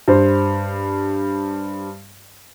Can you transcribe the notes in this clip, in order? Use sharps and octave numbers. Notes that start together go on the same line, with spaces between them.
G2 C5